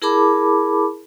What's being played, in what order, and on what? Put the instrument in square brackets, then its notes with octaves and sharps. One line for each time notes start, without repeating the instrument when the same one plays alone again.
[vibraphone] E4 G#4 A#4 A5 B5 D6